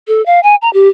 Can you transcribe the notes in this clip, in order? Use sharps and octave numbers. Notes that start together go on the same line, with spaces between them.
A4
F5
G#5
A#5
G4